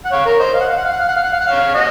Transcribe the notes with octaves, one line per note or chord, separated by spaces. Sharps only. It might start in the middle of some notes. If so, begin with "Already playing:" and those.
F#5
C#5 F5
A#4 C#5
C5 D#5
F5
F#5
F5
F#5
F5
F#5
F5
F#5
F5
F#5
F5
F#5
C#5 F5
D#5 F#5